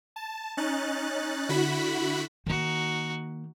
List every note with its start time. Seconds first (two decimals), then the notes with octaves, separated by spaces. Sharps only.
0.16 A5
0.57 C#4 D#4 F#6 A6
1.49 D3 E4 F#4 B5 F#6 B6
2.47 D#3 A#3 D#4 F#4